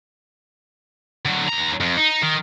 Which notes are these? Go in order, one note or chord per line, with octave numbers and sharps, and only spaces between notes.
D3 F#3
D#2 A#5
F2
D#4
D#3